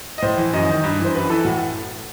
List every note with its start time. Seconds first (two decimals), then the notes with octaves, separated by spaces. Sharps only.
0.18 D#5
0.22 A2 C5
0.37 E3
0.53 F#2 D#5
0.69 D#3
0.84 G2
0.99 E3 C5
1.14 F#2 B4
1.29 E3 A4
1.44 A2 F#4